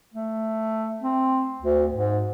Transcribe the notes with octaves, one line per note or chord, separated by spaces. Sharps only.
A3
C4
D2
G#2